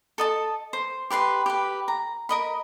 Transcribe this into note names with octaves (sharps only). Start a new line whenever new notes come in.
A4 D#5 A5
C5
G4 B4 D5 C6
G4 B4
A#5
A#4 D#5 B5